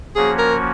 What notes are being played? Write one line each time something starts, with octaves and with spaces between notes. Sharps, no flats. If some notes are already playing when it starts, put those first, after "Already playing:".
F3 A#3 C#4 F#4 G#4 C#5
A#4